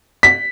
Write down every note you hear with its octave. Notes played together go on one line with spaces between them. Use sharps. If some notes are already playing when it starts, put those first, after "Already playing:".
B6